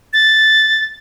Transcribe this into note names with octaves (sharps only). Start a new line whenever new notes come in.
A6